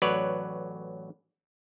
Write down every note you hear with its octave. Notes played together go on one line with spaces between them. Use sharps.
A1 F#3 B4 C#5 D5